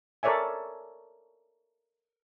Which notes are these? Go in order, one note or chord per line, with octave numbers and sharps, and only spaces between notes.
A4 A#4 C#5 D5 E5 G#5